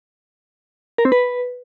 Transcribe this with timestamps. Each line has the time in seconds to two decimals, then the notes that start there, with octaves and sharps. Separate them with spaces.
0.98 A#4
1.05 C4
1.12 B4